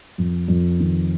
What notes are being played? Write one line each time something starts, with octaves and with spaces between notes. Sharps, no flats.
F2
F2
D#3